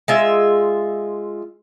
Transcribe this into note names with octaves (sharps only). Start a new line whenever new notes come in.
G#3 F4 E5